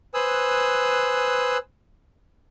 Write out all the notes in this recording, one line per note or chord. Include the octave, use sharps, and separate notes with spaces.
B4 C5 G#5 D#6 E6 F#6